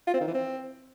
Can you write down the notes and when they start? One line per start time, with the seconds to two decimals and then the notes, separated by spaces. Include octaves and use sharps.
0.07 F4
0.14 C4
0.21 D#3
0.27 E3
0.34 C4